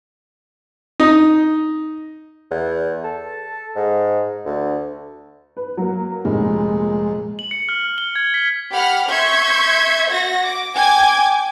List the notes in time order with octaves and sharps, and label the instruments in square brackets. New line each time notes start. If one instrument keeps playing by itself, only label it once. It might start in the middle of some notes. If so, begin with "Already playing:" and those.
[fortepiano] D#4
[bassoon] E2
A4
G#2
D2
[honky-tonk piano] B4
F#3 A#3
[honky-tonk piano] F1 A#2 [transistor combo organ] G#3
[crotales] F#7
C#7
F6
F6
G7
G#6
B6
[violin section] G4 F#5 B5 F6
E5 C6 C#6 G6 G#6
F#4 A#6
D6
G5 G#5 D6 G#6